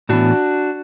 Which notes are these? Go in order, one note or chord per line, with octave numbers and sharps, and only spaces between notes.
A2 E3 B3 D4 F#4